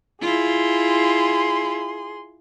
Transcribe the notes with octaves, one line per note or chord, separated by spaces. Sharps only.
E4 F4 G#4 C6